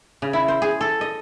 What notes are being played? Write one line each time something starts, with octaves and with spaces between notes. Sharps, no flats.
C#3
E4
C5
G#4
A4
D#5